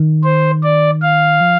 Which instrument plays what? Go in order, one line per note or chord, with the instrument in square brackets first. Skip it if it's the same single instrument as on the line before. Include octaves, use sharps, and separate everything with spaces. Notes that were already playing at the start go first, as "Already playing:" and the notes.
Already playing: [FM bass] D#3
[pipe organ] C5
D5
F5
[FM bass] F3